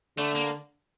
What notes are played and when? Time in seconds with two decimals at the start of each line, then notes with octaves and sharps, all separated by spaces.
0.18 D3 A3
0.36 A#3